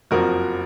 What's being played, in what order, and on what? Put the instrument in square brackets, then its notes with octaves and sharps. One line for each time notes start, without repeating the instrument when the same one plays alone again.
[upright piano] F#1 F2 F3 F#4 A#4